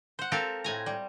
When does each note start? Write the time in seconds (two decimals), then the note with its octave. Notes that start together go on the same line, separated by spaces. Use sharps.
0.19 C5 F#5
0.32 C4 F4 G4 A4 A#4 F5
0.64 A2 G#5 A#5
0.86 G3